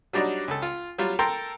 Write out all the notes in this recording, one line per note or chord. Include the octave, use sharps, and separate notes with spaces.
F#3 G3 D4 D#4 F#4 D5
C#2 A4
F4
F#3 G3 F4
A4 A#4 G5 A#5 C6